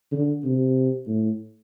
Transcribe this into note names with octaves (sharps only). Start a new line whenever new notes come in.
D3
C3
A2